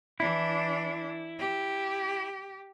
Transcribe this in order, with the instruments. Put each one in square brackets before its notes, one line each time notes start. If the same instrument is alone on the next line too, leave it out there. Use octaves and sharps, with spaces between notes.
[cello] E3 D4 [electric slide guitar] E4
[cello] G4